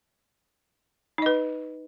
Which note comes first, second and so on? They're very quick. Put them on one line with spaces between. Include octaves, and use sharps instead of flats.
D#4 D#5 B4